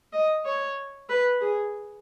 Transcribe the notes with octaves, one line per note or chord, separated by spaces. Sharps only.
D#5
C#5
B4
G#4